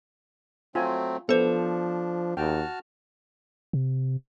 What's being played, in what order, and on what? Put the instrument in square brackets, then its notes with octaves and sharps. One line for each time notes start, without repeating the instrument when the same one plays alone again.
[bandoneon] F#3 A3 C4 [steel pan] F4 G#5
[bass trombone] F3 [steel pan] B3 [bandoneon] D4 [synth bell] A4 C5
[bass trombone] D#2 [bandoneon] F#4 A5 F6 [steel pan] G5
[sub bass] C3